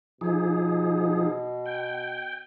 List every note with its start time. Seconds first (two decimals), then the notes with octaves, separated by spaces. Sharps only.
0.21 B2 F3 D#4 G#4
1.66 G5